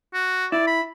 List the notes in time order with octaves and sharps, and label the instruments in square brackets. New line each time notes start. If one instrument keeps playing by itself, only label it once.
[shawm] F#4
[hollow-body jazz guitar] E4 [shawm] D5
[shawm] B5